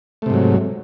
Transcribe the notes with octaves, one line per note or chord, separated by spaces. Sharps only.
G#2 C3 F#3 A3